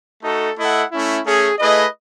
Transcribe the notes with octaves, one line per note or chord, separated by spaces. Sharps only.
A3 D#4 F#4 A4
A3 E4 A4 D#5 F#5
A3 C#4 E4
A3 C#4 G#4
A3 E4 G#4 B4 D#5